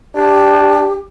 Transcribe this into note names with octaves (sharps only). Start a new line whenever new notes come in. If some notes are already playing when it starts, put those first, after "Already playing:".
D4 G4